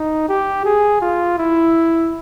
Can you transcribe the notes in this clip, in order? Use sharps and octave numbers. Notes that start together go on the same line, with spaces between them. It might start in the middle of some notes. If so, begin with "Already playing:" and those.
Already playing: D#4
G4
G#4
F4
E4